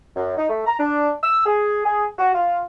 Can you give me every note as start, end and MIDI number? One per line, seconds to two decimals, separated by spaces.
0.16 0.34 42
0.37 0.46 63
0.49 0.63 57
0.66 0.74 82
0.79 1.11 62
1.23 1.42 88
1.46 1.84 68
1.85 2.05 68
2.18 2.31 66
2.35 2.60 65